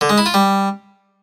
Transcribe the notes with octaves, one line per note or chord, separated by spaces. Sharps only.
D3
G#3
E4
F4
G3